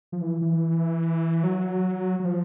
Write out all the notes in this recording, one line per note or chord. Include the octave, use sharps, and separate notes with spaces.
F3
E3
E3
F#3
F#3
F3